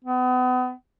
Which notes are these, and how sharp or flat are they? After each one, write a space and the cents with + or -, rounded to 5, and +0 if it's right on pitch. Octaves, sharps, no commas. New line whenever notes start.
B3 +35